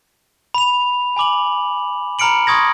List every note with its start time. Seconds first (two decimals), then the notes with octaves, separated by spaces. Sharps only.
0.54 B5 F7
1.16 G#5 B5 D6 F#7
2.19 A#5 B5 F6 C#7 D7 F#7
2.47 C6 C#6 D#6 G#6 A#6